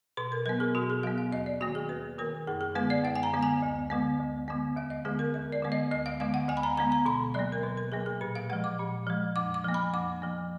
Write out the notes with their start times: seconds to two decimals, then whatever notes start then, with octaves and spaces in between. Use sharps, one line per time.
0.17 B2 B4
0.32 A#4
0.46 F#3 B3 A#4
0.60 G#4
0.75 B2 F#4
0.90 G#4
1.03 F#3 B3 F5
1.18 F5
1.32 D#2 D#5
1.46 D5
1.61 D#3 A#3 F#4
1.75 G#4
1.89 D#2 B4
2.18 D#3 A#3 A#4
2.47 F#2 G#4
2.61 G#4
2.75 D3 G#3 B3 B4
2.90 D5
3.04 F#2 F5
3.16 G#5
3.23 A#5
3.33 D3 G#3 B3
3.43 G#5
3.62 D2
3.90 D3 G#3 B3
4.19 D2
4.48 D3 G#3 B3
4.76 D#2 F5
4.90 D#5
5.05 D3 G#3 B3 G#4
5.19 A#4
5.34 D#2 A#4
5.52 D5
5.63 D3 G#3 B3
5.72 D#5
5.91 D2 D#5
6.06 F5
6.20 D3 G#3 B3 F5
6.34 F#5
6.49 D2 G#5
6.57 B5
6.63 A#5
6.77 D3 G#3 B3 A#5
6.92 A#5
7.06 B2 B5
7.34 F#3 A#3 D5
7.52 A#4
7.63 B2 B4
7.77 A#4
7.92 F#3 A#3 G#4
8.06 G#4
8.21 A#2 B4
8.35 F5
8.50 F3 G#3 F#5
8.64 D6
8.79 A#2
9.07 F3 G#3
9.36 F2 D6
9.54 D6
9.65 F3 A#3
9.74 B5
9.93 F2 D6
10.22 F3 A#3